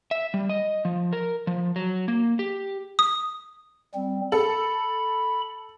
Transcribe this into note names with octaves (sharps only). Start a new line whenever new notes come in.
E5
G3
D#5
F3
A#4
F3
F#3
A#3
G4
D#6
G3 C4
A4 B5